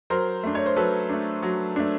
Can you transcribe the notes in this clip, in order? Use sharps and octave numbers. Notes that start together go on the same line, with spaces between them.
F#3 A#4 C5
A3 D4
C#5
C5
F#3 A4 B4
A3 D4
F#3
A3 D4